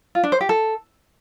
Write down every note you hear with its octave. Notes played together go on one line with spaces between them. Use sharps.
F4
D4
C5
G4
A4